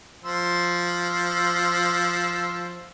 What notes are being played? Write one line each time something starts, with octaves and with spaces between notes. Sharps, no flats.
F3 C6 E6